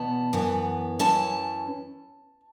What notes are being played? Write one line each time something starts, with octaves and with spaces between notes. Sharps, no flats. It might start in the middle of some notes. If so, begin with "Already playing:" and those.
Already playing: E2 B2 B3 A5
F#2 E3 B3
F#2 E3 C#4 A5